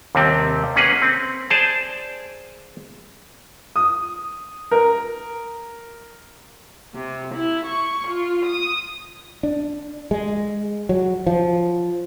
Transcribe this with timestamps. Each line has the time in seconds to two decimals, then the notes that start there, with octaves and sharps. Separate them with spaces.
0.15 D#2 C3 G3 C4
0.75 A#3 C#4 G#4 B4 F#5
1.02 C4
1.50 G#4 C5 D5 A5
3.76 D#6
4.71 A#4
6.94 C3
7.34 E4
7.66 C#6
8.07 F4
8.45 D#6
9.43 D4
10.11 G#3
10.89 F#3
11.27 F3